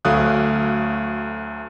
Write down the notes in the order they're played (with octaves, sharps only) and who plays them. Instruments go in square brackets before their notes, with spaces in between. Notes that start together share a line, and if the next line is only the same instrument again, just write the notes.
[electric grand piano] D2 F#3 A3 F5 D#6 F#6